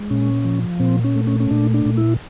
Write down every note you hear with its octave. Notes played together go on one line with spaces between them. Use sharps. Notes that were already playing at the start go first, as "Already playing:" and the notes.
Already playing: G#3
A#2 C#4
F3
A#2 C4
C#4
A3
C#4
C#4
A#2 D4
D4
A#2
E4